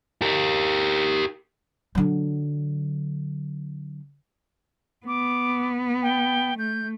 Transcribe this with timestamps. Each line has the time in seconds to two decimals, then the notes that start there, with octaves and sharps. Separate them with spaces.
0.22 G4 A#4
1.95 D3 F#3
5.07 B3 D6
6.02 G5
6.59 A3 G6